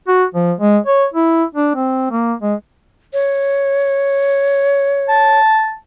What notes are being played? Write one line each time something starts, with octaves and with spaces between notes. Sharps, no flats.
F#4
F3
G#3
C#5
E4
D4
C4
A#3
G#3
C#5
A5